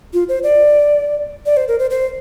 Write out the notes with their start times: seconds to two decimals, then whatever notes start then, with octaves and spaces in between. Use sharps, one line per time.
0.14 F4
0.29 C5
0.43 D5
1.46 D5
1.57 C5
1.68 A#4
1.79 C5
1.90 C5